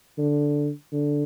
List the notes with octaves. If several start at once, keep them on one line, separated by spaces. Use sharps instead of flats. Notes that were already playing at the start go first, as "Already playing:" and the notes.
D3
D3